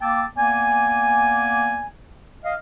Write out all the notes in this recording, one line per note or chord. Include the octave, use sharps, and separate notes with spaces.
A#3 G5 A5 D6 E6
A#3 B3 D5 G#5
D#5 F5